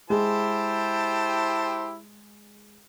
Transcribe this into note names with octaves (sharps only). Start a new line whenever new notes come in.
G#3 E4 G4 C5 A5